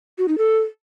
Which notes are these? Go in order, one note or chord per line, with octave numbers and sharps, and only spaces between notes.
F#4
D#4
A4